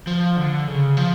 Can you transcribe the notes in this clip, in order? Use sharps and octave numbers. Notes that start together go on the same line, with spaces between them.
F3
D3
C#3
F3